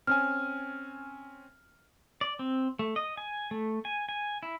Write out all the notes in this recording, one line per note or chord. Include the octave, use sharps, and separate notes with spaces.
C4 C#4 G#5 F6
D5
C4
A3
D#5
G#5
A3
G#5
G#5
E4